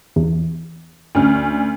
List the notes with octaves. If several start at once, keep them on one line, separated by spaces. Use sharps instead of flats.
E2
D2 C#4 F6